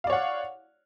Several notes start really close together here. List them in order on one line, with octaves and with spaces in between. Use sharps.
F5 D5 C#5 F#5